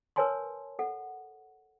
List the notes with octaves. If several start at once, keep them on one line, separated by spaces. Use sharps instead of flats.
A#4 B4 C#5 G#5 A5 C6
A4 F#5